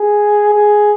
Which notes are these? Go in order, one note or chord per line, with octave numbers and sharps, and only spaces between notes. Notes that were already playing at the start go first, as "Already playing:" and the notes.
Already playing: G#4
G#4